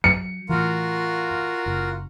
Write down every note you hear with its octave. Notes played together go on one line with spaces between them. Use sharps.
F#3 C#7
A2 E3 F4 F#4 A#4
F#1